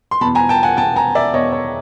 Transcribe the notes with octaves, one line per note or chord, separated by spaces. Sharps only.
C6
E2 B2 A5 B5
G#5 A#5
G5 A5
F#5 G#5
B2 G5 A5
E2
G#5 A#5
D5 E5
E2 B2 C#5 D#5
C#5